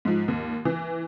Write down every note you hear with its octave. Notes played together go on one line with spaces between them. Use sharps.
G#2 F3
D#2
E3